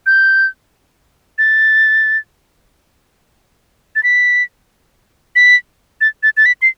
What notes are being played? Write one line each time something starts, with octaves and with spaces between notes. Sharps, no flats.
G6
A6
A6
B6
B6
A6
A6
A6
B6
C7